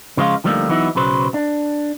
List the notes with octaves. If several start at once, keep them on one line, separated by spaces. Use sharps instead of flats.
C#3 F3 G#3 F4
D3 F3 G3 A3 A#3 D#4
E3 F#3 B3 D#4 E4
B1 C#3 F#3 B4 C5
D4